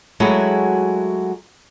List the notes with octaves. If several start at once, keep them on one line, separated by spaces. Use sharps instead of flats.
F#3 G#3 A3 E4 F#4 G#4